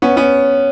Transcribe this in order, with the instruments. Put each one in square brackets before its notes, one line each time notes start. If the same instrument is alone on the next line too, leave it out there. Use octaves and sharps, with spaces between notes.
[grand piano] B3 C#4
B3 C#4